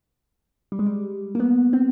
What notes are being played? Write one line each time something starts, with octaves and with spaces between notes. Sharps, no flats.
G3
G#3
G3
A#3
B3
C4